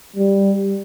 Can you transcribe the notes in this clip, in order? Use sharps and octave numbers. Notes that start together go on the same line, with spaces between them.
G3